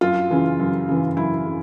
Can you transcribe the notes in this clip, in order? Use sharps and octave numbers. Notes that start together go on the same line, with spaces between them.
F#2 F4
C#3 E3
F#2
C#3 E3
F#2 E4
C#3